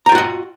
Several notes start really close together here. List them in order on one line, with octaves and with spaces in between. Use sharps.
A#5 G5 F4 F#4 D#5